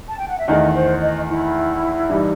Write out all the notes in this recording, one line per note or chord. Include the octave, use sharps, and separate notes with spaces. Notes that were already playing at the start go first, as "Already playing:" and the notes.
A5
G5
F#5
E5
E2 D#3 A3 D#4 D#5
C5
D#5
E4
G2 E3 G3 D#4